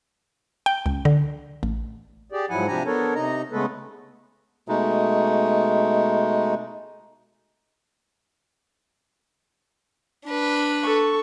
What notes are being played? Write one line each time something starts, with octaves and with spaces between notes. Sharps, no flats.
G5
C#2
D3
A1
G4 G#4 D5
G#2 F3 F#3 E4 F#5 G#5
C3 F3 D4 G4 G#5 A#5
B3 D4 A4 A#4 C#5
C3 D#4 D#5 A#5
C#3 G#3 A3 B3 A4 B4
B2 G#3 A3 D#4
D4 B4
A4 C#6